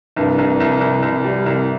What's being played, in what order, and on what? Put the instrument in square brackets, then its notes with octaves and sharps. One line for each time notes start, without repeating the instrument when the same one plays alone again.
[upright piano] C2 [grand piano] G2
[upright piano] C2
C2
C2
C2
G3
C2